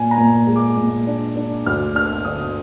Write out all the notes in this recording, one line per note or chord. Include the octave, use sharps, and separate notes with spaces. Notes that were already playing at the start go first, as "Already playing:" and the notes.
Already playing: A#2 G#5
A#5
A#2
G#3
D6
A#2
D4
D4
D2 F6
D4 F6
D3 D#6